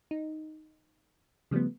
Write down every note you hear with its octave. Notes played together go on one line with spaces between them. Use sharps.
D#4
C#3 F3 G3 A3 B3